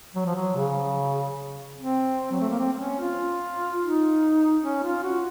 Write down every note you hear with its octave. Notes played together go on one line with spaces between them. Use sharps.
F#3
F3
F#3
C#3
C4
F#3
A3
A#3
C4
C4
C#4
F4
D#4
C#4
F4
F#4